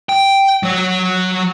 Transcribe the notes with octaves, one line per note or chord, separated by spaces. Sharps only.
G5
F#3 C#5